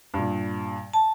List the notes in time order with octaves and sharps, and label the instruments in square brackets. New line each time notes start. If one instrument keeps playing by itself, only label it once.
[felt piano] G2 A#2
[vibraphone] A5